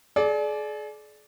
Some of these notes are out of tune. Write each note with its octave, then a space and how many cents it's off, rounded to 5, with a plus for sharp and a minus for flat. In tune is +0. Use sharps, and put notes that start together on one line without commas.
G#4 +40 D5 +0